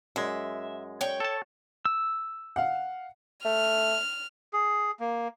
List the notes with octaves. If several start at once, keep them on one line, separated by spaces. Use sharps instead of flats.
F#2 G#3 E5
C#5 G5
A4 A5
E6
F5 F#5
A3 F6
G#4
A#3